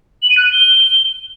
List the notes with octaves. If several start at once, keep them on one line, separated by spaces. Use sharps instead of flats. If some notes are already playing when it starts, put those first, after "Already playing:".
F#7
D#7
F#6
D#7
G7